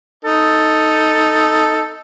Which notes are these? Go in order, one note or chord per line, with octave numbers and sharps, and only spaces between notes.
D#4 A4